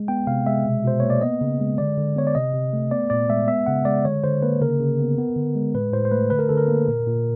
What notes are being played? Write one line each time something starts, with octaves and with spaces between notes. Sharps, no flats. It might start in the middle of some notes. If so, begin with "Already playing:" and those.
Already playing: G#3
B3 G5
C3 F5
G#3 E5
B2
B2 C5
A#3 C#5
D5
B3 D#5
C#3
G#3
D3 D5
D3
B3 C#5
D5
C3 D#5
C3
A3
B3 D5
A#2 D5
G#3 E5
B3 E5
C#3 F#5
G#3 D5
D3 C#5
D3 C5
A#3 B4
C#3 A#4
C#3
B3
B3
D3
G#3
A2 B4
A2 C5
C5
A3 B4
D3 B4
A#4
D3 A4
A#4
A#3
A#2
A#2